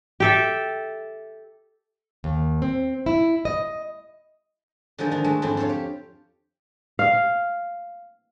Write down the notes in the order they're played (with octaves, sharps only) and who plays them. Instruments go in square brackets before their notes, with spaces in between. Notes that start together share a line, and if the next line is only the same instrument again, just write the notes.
[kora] G4 A4 E5
[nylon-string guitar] D#2
C4
E4
D#5
[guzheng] D3 D#3 F3 G#3 D#4
D#3 D4
G#3 A3 F#4 A4
F2 G#2 D3 C4 D4 E4
F4 A4 C5 C#5 F5
G4
[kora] F5